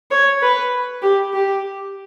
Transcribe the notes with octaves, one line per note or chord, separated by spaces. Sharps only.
C#5
B4
G4
G4